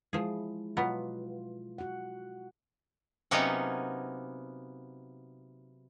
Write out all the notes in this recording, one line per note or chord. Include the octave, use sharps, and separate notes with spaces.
F3 G#3 E4 G#4
B2 F#3 B3 F4
F#4 F#5
C3 F#3 A#3 B3 C#4 D#4